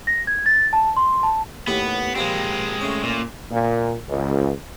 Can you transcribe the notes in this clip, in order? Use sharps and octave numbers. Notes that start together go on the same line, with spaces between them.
A#6
G#6
A6
A5
C6
A5
D#2 A2 B3 G4
A#2 F3 G3 G#3 C4
A3 C#4
A#2
A#2
C#2